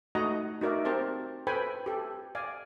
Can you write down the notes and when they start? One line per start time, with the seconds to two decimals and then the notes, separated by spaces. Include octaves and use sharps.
0.15 A3 D#4 F#4 D#5 F#5 A#5
0.61 D#4 F#4 A#4 D5 E5
0.85 C4 G4 A#4 C5 A5
1.47 A4 B4 C5 G5 G#5 B5
1.86 G4 A4
2.35 D5 F5 G#5